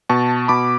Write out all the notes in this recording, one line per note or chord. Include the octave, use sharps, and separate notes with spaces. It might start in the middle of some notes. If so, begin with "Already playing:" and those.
B2 A5 C#6
B2 B5 D6